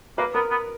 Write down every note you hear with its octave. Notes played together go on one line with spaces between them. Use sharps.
A#3 B4
B3 A#4
B3